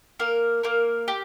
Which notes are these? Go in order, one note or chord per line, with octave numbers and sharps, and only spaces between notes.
A#3 A#4
A#3 A#4
G4